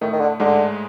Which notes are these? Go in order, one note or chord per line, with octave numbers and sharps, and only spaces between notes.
A2 D#3 A3
D#3
D3
G#2 D3 G#3